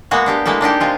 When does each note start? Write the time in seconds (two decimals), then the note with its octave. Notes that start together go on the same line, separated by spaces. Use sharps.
0.11 G#3 A#3 B3 F#4
0.26 D4 G4 F5
0.45 G#3 A#3 E4 A4
0.61 A#3 D4 D#4 G4
0.80 C3 G#3 F4